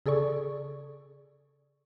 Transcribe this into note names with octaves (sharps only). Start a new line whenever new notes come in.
C#3 G#4 A4 D5 C#6